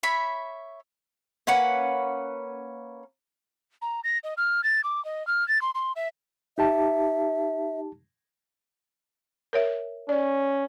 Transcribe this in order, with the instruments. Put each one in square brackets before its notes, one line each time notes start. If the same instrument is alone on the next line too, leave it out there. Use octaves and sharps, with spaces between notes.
[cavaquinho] C#5 E5 B5
[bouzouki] A#3 C#4 B4 F#5
[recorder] A#5
A#6
D#5
F6
A6
D6
D#5
F6
A6
C6
C6
E5
[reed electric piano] D#4 G4 A5 [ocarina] E5
[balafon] A#4 C#5 E5
[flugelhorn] C#4 [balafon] D5